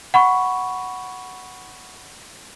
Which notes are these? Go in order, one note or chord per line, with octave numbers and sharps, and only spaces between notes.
F#5 B5 C#6